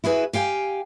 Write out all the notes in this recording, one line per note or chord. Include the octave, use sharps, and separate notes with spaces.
E4 F#4 G#4 B4
G4 F5 G5 G#5